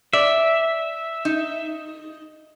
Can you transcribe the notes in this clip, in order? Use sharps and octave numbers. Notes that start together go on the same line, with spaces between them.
D5 E5
D#4